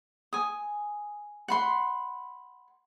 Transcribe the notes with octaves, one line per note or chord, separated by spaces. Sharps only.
G#5 D#6
F#5 B5 C6